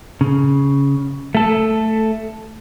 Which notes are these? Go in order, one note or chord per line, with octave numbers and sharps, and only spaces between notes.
C#3
A3 A4